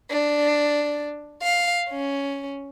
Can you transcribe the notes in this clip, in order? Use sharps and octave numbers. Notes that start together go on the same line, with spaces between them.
D4
F5
C#4